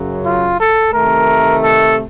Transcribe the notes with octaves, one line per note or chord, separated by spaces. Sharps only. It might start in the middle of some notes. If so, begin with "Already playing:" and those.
Already playing: F#2 C#3 F#3
F4
A4
C3 D#3 A3 A#4
A4